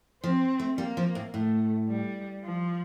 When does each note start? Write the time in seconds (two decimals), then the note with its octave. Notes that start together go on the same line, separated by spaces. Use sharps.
0.23 F3 C4
0.59 A3
0.78 G3 A#3
0.97 F3
1.15 A2
1.34 A2 A3
1.89 G3
2.44 F3